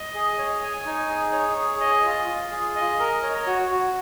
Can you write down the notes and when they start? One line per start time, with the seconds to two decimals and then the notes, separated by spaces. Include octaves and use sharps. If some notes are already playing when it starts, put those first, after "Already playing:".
Already playing: D#5
0.14 G#4
0.38 C#5
0.62 G#5
0.86 D#4
1.09 G#4
1.32 C#5
1.57 G#4
1.80 D#5
2.05 F4
2.28 F4
2.51 G#4
2.75 D#5
2.99 A#4
3.23 C#5
3.47 F#4
3.71 F#4